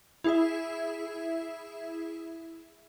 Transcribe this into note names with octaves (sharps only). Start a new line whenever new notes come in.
E4 G#4 E5